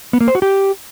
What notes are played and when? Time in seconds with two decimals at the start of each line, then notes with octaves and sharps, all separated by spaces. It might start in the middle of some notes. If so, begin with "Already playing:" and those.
0.13 B3
0.21 A#3
0.28 C5
0.35 F#4
0.42 G4